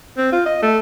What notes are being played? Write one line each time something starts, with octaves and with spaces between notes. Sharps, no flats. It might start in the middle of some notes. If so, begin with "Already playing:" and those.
C4
F4
D#5
A3